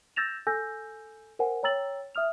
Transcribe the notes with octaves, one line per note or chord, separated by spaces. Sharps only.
E6 G6 A6 A#6 E7 F7
A4 G#5 E6 G6 A#6
A#4 C5 F#5 G#5
C#5 G5 A#5 E6 A6 F#7
E5 D#6 F6 F7